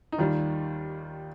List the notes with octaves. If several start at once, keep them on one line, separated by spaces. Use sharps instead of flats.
D#4
D#2 D#3 G3 F4